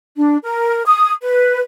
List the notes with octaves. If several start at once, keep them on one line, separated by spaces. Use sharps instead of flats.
D4
A#4
D#6
B4